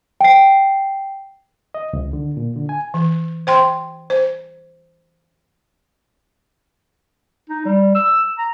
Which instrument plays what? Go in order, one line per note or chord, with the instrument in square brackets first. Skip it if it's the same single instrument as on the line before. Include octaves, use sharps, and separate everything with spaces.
[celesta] G5 C7
[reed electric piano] D#5
C#2
D3
A#2
D3
G#5
[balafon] E3
C5 G5 C6
C5
[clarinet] D#4
G3
E6
A#5